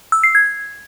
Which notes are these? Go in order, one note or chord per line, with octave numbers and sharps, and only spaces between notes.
E6
C7
G#6